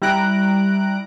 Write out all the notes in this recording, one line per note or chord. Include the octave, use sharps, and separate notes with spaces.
G3 E4 A#5 F#6 D7